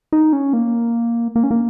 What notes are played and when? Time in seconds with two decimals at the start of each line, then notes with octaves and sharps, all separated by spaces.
0.13 D#4
0.33 C#4
0.53 A#3
1.36 A#3
1.43 C#4
1.51 A#3